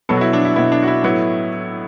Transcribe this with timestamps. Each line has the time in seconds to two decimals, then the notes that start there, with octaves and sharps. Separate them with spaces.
0.09 B2 F#3 B3 A4
0.17 F#4
0.21 E4
0.33 D4
0.45 E4
0.56 B2 F#3 B3 E4
0.72 D4
0.82 F#4
0.88 E4
1.03 A2 F#3 B3 E4